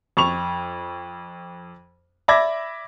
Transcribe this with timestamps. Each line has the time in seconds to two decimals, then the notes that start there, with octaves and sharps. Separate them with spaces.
0.17 F2 C#6 F7
2.28 D5 E5 B5 D6 G#6 A#6